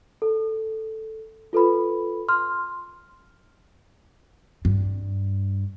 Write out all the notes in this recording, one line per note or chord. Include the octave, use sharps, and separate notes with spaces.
A4
F4 A4 B4 B5
C6 F6
G2